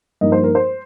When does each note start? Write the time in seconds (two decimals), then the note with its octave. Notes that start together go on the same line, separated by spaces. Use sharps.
0.21 G2 F3 A#3 D#4 D#5
0.32 C5
0.44 A#4
0.55 C5